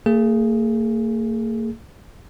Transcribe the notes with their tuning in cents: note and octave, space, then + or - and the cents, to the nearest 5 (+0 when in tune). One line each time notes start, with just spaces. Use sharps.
A#3 -45 G#4 +0